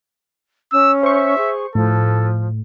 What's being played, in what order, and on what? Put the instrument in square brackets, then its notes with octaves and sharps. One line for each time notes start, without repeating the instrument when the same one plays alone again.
[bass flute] C#4 [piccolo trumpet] E6
[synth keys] C5 C#6 [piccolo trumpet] E5
[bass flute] G#4
[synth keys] A2 [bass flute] F3 [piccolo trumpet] A4